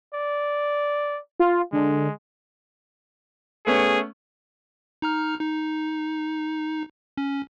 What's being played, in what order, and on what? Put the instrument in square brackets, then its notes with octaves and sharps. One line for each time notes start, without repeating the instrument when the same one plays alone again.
[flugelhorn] D5
[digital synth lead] F4
[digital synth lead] D3 [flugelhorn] G#3
[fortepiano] A3 B3 C#4 [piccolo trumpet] G#4
[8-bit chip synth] D#4 A#5 F6
D#4
C#4